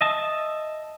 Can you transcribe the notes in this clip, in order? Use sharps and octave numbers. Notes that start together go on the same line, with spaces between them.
D#5 E5 A5